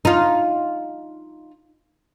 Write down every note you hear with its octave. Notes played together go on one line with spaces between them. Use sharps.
D#4 F4